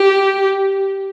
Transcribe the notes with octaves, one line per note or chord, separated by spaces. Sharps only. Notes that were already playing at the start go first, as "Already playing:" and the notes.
Already playing: G4